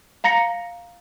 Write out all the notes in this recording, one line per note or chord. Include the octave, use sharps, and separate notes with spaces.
F5 A#5 A#6 C#7